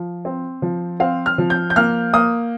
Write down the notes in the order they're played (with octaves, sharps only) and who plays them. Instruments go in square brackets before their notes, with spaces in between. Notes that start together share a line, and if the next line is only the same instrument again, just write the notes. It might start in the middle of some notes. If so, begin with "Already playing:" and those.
Already playing: [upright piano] F3
C4
F3
C4 F5
F6
F3
G6
G6
A#3 F6
A#3 D#6